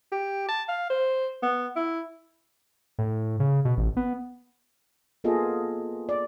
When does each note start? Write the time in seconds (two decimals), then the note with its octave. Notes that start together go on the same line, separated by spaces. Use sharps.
0.12 G4
0.49 A5
0.69 F5
0.90 C5
1.43 B3
1.76 E4
2.99 A2
3.40 C#3
3.65 B2
3.78 A1
3.97 B3
5.24 A#3 B3 F4 G#4 A4 D#5
6.09 D5